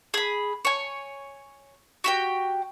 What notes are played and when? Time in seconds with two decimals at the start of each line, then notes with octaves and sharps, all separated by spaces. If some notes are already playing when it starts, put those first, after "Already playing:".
0.14 G#4 B5
0.65 C#5 G#5
2.04 F#4 G4 G5